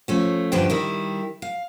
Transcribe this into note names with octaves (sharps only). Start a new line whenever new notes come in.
F3 A3 C#4
G2 D3 E3 F3 D4 G4
D#3 G3 E4
F5